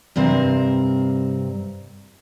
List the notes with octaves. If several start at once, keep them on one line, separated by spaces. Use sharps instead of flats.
G2 C3 C4 A#4